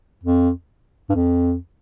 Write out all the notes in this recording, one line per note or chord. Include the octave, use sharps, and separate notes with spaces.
F2
G2
F2